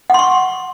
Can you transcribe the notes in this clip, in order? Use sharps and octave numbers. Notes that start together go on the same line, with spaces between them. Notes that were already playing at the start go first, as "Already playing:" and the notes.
F#5 C6 C#6